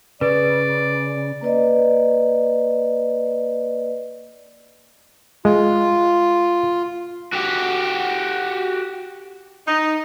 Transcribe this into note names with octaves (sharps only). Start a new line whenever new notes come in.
C#3 B4 D5
A#3 B4 D5 D#5
G#3 F4
F#4 G4
D#4